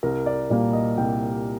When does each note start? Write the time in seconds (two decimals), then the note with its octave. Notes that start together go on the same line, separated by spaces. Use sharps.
0.03 C2 A#4
0.26 D5
0.50 A#2 G3 A#3 D5
0.73 D#5
0.97 C2 G5